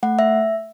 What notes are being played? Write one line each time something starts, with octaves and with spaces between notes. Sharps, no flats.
A3 F#5
E5